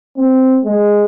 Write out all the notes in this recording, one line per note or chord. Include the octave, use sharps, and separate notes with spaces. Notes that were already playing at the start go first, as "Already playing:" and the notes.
C4
G#3